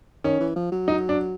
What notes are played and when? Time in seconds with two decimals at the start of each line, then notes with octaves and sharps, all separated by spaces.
0.24 D#3 C#4
0.40 E3
0.56 F3
0.72 F#3
0.88 D#4
1.09 D4